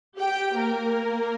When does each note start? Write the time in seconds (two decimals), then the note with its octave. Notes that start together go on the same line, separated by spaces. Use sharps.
0.18 G4 G5
0.56 A#3 A#4